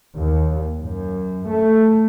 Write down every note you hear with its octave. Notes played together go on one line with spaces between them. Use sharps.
D#2
F#2
A3